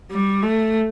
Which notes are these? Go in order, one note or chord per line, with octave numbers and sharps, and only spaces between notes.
G3
A3